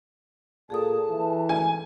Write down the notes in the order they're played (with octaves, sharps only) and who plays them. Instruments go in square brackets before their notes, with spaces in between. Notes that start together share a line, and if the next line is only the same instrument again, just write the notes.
[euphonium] A#2 [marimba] G#4 A4 D#6 [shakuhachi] A5
[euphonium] E3
[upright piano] G#5